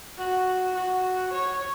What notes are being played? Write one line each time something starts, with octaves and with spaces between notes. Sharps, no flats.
F#4
F#4
C#5